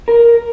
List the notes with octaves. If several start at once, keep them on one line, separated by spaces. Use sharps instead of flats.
A#4